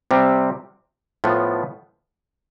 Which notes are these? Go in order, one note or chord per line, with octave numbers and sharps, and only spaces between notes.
C3 G3 C4 G4
A2 F3 B3